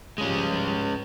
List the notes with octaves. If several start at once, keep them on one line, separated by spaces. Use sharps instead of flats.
G#2 F3 G3 G#3 C#4